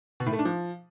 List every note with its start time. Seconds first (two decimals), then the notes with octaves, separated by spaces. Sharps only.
0.20 B2
0.26 A2
0.33 A3
0.39 D4
0.45 F3